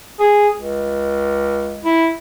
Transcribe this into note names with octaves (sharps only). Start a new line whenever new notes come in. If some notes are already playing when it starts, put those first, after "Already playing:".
G#4
C#2
E4